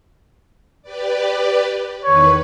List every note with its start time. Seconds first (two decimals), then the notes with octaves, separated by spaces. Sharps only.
0.82 G4 B4 D5
2.04 E2 D#3 B4 C#5